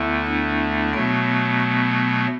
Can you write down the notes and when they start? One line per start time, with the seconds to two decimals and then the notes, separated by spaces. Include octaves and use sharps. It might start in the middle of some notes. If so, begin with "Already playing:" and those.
Already playing: D2 D3 A3 B3 E4
0.27 D4
0.93 B2 F#3 A3 B3
1.60 B3